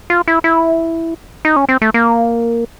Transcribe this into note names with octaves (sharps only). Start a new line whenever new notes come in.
F4
E4
E4
D#4
C#4
C4
A3
A#3